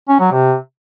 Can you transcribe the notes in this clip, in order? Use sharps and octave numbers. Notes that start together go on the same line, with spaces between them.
C#4
F#3
C3